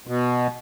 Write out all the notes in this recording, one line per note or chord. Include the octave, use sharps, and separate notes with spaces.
B2